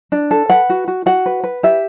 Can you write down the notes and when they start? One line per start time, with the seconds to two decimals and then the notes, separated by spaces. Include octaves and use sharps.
0.12 D4
0.31 A4
0.50 B4 F#5
0.70 F#4
0.88 F#4
1.06 F#4 F#5
1.26 B4
1.44 B4
1.63 G4 E5